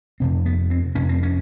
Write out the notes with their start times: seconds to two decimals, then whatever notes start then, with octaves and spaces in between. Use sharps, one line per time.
0.20 F2 C3 C4
0.46 B3
0.70 C4
0.95 F2 C3 C#4
1.09 C4
1.23 C#4